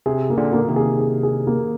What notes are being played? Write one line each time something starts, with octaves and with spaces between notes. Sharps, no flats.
C3 G#4
A#3
A#2 D3
A#3
C3 D#3
G#4
G#4
G#4
A#3